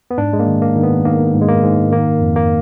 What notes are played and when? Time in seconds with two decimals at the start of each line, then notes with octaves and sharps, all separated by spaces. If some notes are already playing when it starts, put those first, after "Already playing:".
0.11 B3
0.18 G#2 D4
0.33 G#3
0.40 A#3
0.47 D#3
0.62 A#3
0.76 D#3
0.83 B3
1.05 D#3 A#3
1.35 G#2
1.41 G#3
1.49 A#3
1.63 G#2
1.92 D#3 A#3
2.21 F2
2.36 A#3